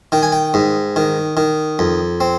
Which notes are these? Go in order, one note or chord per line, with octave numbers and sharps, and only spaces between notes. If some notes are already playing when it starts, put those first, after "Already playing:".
D#3 G5
G#5
G5
G#2
D#3
D#3
F2
C4